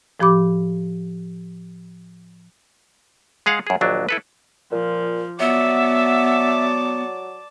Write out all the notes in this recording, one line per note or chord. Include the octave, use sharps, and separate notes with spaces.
A2 F3 G4 B5 D6
G#3 G#4 F5 F#5
F#2 G#4
A#1 D#2 F#3 D4
E4 A4 B4
A#2 F3
F#3 B3 D5 E5 A5